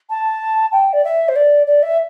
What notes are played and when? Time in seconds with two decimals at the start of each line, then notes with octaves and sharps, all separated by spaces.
0.10 A5
0.72 G5
0.93 D5
1.04 E5
1.28 C5
1.36 D5
1.67 D5
1.83 E5